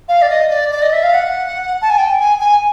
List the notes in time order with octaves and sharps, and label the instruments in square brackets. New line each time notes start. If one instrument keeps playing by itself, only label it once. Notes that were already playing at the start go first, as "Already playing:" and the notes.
[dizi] F5
D5
D#5
D5
D5
D#5
E5
F5
F#5
A5
G#5
G5
G#5
G#5